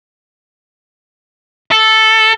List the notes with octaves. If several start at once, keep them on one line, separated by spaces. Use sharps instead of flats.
A4